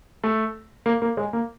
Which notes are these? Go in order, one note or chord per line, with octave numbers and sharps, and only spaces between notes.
A3
A#3
A#3
G#3
A#3